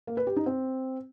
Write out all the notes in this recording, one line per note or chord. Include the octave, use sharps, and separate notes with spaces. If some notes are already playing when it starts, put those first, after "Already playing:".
A#3
B4
G4
D#4
C4